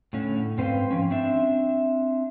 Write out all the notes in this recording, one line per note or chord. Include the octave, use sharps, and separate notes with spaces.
A2 D3 C#4
G#2 C4 B4 C5 F5 G5
F3 C#4
C4 D4 E5